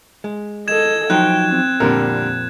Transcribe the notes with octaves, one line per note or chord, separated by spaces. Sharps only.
G#3
A4 D#5 G#6 E7
F3 F#3 D#4 G5 F#6
C4
F2 A#2 D3 G3 A#4